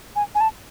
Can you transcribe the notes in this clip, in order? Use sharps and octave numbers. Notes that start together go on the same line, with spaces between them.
G#5
G#5
A5